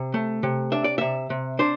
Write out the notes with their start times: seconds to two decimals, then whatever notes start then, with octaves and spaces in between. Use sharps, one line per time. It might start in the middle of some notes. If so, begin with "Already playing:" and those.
Already playing: C3
0.14 A3
0.43 C3
0.72 D4 E5
0.84 D5
0.98 C3 E5
1.30 C3
1.59 D4 C5